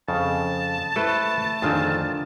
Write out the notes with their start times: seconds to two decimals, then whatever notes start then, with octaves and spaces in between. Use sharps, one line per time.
0.08 F2 C#3 A5
0.96 A3 E4 A4 B4 C5
1.62 F2 D3 D#3 C4 F4 G#4